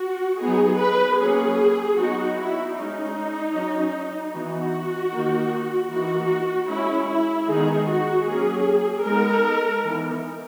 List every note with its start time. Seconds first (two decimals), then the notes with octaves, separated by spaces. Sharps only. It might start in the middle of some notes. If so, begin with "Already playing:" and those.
Already playing: F#4
0.40 F#3 B3 D#4 G#4
0.79 B4
1.18 F#3 A#3 C#4 G#4
1.97 F#3 B3 D#4 F#4
2.37 E4
2.75 G#3 C#4 D#4
3.54 F#3 C#4
4.33 E3 B3 D#4 F#4
5.12 D#3 A#3 D#4
5.90 E3 A#3 D#4 F#4
6.69 G#3 C#4 E4
7.08 E4
7.48 D#3 G#3 B3 D#4 G#4
7.87 F#4
8.26 F#3 A#3 C#4 G#4
9.05 G#3 B3 D#4 A#4
9.84 E3 B3 D#4